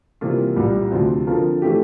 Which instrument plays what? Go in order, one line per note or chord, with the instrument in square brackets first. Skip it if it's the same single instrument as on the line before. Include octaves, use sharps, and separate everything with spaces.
[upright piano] C3 E3 G3 A#3 F4
C2 A#2 G3
D2 C3 F3 C4
D3 F3 C4 F4 A#4
E3 A3 C4 G4